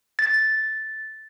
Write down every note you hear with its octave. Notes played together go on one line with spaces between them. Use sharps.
A6